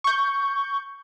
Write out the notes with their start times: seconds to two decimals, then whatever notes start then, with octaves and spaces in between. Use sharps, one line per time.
0.04 C#6 G6